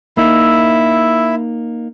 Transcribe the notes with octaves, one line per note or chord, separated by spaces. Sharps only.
A#3 D#4 E4 E5